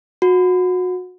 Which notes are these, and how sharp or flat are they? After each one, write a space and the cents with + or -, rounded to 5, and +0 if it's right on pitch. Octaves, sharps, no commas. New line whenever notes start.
F#4 -25